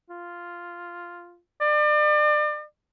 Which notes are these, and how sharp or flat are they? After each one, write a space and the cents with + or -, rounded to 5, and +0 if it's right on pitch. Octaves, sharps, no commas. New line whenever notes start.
F4 -5
D5 +35